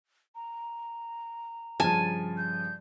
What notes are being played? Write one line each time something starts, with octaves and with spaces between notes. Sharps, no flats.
A#5
G2 C#3 F3 G#5 A5
G6